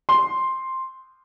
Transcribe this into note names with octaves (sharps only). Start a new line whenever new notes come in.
C6